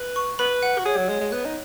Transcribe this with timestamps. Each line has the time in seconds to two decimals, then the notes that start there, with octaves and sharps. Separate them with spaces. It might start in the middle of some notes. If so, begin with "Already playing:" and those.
Already playing: B4
0.16 C#6
0.39 B4 B5
0.63 F#5
0.79 F#4
0.85 G#4 C#5
0.97 F#3
1.09 G#3 C#5
1.21 G#3
1.32 B3 F#6
1.46 D#4